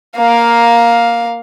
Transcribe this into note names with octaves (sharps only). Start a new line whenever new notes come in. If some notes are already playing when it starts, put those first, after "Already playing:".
A#3 F5